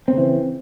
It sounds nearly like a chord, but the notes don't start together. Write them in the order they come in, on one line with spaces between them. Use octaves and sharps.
C4 C#3 E3